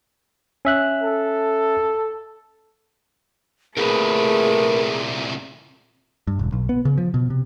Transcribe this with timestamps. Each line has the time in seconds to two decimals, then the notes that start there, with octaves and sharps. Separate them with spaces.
0.65 C#4 E5 F#6
1.03 A4
3.77 C2 A#2 A3 G#4 A#4 B4
6.27 G2
6.39 E1
6.52 B1
6.69 B3
6.85 C#3
6.98 F3
7.14 B2
7.30 C3